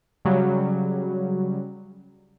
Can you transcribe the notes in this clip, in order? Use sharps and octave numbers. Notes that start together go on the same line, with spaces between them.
C#3 F#3 G3